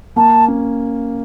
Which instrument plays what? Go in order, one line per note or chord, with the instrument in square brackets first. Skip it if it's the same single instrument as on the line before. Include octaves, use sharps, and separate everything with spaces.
[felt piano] A#3 [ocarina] A5
[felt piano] C#4